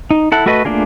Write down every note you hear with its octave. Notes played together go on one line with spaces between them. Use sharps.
D#4
E4 A4 F#5
A3 F#4 A4 B4 D#5
A3 A#3 D4 F4 G#4